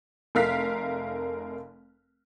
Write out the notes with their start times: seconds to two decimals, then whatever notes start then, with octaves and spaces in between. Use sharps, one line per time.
0.35 F1 A3 A#4 F5 F6 B6